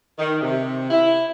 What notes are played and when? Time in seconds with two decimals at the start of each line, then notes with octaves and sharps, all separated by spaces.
0.19 D#3
0.41 C3
0.91 E4